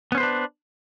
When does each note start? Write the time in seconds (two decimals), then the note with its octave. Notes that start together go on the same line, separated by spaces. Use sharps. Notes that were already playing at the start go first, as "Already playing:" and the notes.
0.12 B3
0.15 C#4
0.17 C5
0.20 B4
0.23 D4